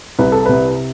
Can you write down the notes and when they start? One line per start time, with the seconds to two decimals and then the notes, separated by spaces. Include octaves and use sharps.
0.19 C2 B4
0.32 A4
0.46 C3 B4